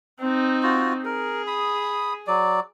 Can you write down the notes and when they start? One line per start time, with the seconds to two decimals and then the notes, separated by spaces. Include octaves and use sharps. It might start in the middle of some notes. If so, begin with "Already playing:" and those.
0.20 C4 D#4
0.63 F4 F#4
1.05 G#4 A#4
1.47 B5 D#6
2.27 F#3 D5